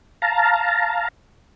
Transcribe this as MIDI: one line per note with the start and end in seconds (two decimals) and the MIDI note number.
0.22 1.08 77
0.22 1.08 81
0.22 1.08 82